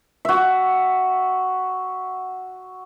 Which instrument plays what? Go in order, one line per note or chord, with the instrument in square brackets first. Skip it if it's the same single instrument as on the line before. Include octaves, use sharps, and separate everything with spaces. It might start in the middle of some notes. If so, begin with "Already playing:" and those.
[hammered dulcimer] F#4 E5